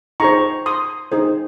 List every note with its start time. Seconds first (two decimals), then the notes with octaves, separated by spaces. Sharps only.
0.20 D#4 G#4 C5 A#5 C#6
0.66 C6 D#6
1.12 D#4 G#4 C5